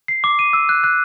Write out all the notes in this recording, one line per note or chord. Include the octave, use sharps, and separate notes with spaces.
C7
D6
D#7
E6
F#6
F#6